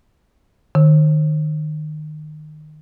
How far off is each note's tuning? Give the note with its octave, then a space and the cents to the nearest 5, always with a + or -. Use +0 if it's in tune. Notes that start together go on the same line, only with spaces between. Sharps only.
D#3 -25